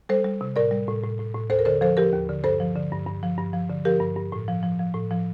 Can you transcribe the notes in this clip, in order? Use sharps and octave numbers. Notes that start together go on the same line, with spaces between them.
G3 A4 C5
G3
C3
A2 A#4 D5
G3
A2
A2
A2
A2
D#2 A4 C5
A#4
D3 A4 C5
F3 A4 C5
F3 G4 A#4
D#2
D3
G2 A4 C5
F3
D3
G2
G2
F3
G2
F3
D3
F3 G4 A#4
G2
G2
A2
F3
F3
F3
A2
F3